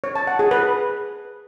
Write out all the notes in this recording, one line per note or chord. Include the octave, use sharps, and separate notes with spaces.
C#5
A5
F#5
G#4
B4